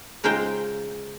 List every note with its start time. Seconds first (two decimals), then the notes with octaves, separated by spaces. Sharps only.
0.24 C#3 G#3 D#4 F4 C5 G5